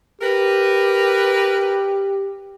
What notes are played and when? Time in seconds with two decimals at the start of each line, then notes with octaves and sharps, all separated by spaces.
0.21 G4 A#4 B4